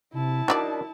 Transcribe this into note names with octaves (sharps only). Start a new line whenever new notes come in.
C3 E4 A5
F#3 D4 D#4 F4 A#4 D5